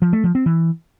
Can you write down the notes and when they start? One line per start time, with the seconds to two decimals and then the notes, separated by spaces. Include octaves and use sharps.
0.02 F3
0.13 A3
0.24 F3
0.35 C4
0.46 E3